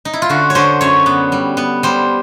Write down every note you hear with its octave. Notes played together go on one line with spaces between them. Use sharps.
D#4
E4
F4
D3 F#4
C#5
D3 C5
F#2 C#5
B3
G3
B3
G3 C5